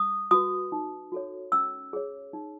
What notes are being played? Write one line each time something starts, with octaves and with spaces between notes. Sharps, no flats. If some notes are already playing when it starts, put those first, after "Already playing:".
Already playing: D#6
F#4 B4 D#6
D#4
F#4 A4 C#5
C#4 E6
G#4 C#5
D#4